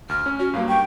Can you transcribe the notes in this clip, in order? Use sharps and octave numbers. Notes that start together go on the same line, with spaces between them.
D2 F6
C#4
C#4 F#4
G2 F#3 A#3 F5
G5 C#6